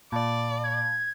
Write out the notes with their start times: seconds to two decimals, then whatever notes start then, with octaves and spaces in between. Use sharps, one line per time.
0.12 A#2 D5 F5 A5 B5
0.63 G#6